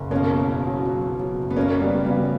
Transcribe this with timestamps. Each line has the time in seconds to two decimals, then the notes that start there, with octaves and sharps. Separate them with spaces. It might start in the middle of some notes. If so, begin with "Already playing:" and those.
Already playing: F#1
0.10 B2 A#3 C#4
0.29 E2
0.47 E2
0.66 F#3
0.84 F#3
1.01 F#3
1.20 F#3
1.39 F#1
1.50 B3
1.56 F#2 A#3 C#4
1.70 C#3 C#4
1.80 G3 B3
1.93 F#3
2.05 G3 B3
2.11 C#3